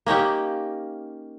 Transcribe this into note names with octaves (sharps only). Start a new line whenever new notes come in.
A#3 C#4 D#4 G4